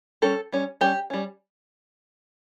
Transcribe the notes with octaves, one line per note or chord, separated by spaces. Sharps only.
G3 C#4 A4
G3 C#4
G3 C#4 G4
G3 C#4